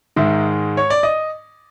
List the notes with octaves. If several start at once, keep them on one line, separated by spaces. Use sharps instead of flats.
G#2 D#3 G#3 E5
C#5
D5
D#5